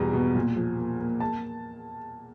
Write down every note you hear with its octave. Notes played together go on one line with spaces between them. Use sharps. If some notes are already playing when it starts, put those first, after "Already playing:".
Already playing: E2 B2 G3 A#5
B2
A#2
F3
A#3
A#3
A5